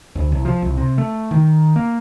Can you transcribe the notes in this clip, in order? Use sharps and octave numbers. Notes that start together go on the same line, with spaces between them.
D2
C2
F3
C2
C3
A3
D#3
A#3